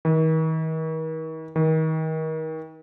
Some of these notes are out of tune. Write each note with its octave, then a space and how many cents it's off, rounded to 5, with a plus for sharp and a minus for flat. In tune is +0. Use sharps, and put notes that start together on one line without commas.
D#3 +40
D#3 +30